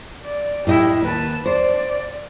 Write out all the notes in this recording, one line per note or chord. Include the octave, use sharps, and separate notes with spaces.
D5
A2 E4 G4 D#5
D#2 B4 A5
C5 D5